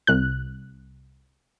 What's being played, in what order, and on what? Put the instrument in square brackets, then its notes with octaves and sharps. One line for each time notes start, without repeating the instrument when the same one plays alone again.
[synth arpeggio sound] C2 F#6